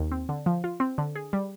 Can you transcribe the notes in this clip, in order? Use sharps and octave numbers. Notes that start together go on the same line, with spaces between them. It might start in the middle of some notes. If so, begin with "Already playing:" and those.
Already playing: D#2
C4
D3
F3
F4
C4
D3
G#4
G3